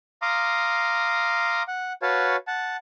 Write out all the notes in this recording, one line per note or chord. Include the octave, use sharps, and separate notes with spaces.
F5 A#5 C6 D6 D#6
F#5
F#4 B4 C#5 F5 A5
F#5 A5